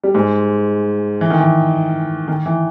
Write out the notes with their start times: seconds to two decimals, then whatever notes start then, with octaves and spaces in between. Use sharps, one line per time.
0.04 G3
0.15 G#2 G#3
1.21 E3
1.30 D#3
1.39 E3
2.28 D#3
2.46 E3